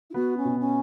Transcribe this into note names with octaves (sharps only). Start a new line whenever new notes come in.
E4
B3 F#4
C#4
B2
C#4